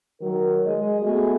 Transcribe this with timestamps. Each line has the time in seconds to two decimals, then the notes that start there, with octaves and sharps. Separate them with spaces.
0.20 D#3 F#3 A#4
0.65 G#3 D#5
1.01 A3 B3 F#4 G#4